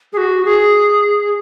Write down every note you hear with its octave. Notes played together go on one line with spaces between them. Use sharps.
G#4
F#4
G#4